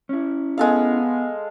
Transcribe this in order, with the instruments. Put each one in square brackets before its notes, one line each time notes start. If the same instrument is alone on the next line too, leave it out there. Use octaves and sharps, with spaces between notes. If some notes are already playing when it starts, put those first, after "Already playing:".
[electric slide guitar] C#4 E4
[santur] G#3 A4 F5 [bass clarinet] B3